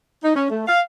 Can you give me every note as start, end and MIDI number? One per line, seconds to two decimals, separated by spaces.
0.24 0.33 63
0.36 0.46 61
0.50 0.66 57
0.68 0.81 77